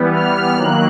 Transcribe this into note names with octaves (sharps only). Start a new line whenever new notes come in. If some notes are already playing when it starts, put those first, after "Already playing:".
Already playing: E3 G3 B3
F6
D#3 F#3 A#3 F#6